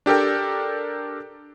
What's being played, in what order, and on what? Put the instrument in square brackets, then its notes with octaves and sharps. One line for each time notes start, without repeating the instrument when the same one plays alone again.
[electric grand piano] D4 G4 A4 A#4 G5